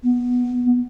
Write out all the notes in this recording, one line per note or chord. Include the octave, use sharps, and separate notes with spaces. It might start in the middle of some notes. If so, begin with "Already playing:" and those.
B3